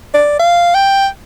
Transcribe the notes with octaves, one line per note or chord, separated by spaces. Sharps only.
D5
F5
G5